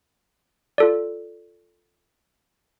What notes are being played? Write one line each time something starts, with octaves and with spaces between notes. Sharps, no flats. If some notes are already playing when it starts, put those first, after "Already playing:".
F4 A4 D5